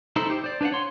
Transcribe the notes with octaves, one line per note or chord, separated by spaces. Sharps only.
D#4 E4 A4 C5
G4 C5
C5 D5
D4 B4 D5 F5 F#5
C#5 C6